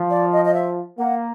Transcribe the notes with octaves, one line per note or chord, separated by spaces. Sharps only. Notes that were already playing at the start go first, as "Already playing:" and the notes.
Already playing: F3
D5
D#5
D#5
E5
A#3 F#5